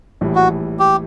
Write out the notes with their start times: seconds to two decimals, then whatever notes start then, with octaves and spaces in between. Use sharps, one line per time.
0.21 A#1 A2 E3 G3
0.35 F#4
0.79 G4